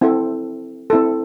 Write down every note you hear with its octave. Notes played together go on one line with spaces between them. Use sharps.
C4 E4 A4
C4 E4 A4